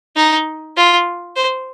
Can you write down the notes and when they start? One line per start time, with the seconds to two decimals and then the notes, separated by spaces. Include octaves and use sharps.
0.16 D#4
0.77 F4
1.36 C5